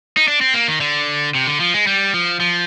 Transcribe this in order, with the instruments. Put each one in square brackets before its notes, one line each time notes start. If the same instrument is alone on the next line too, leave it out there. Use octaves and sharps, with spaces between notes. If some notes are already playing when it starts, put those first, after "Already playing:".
[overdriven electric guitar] D#4
D4
C4
A#3
D#3
D3
C3
D3
F3
G#3
G3
F3
F3